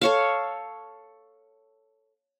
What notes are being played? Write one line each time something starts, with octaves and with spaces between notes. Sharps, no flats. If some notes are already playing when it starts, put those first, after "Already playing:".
A4 C#5 F5